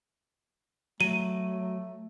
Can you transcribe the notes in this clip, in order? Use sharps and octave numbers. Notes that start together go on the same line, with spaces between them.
F#3 A3 D#7